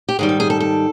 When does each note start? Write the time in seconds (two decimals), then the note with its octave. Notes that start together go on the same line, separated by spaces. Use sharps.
0.09 G4
0.19 G#2 D#3 G3 G#4
0.29 A4
0.40 G#4
0.50 A4
0.60 A4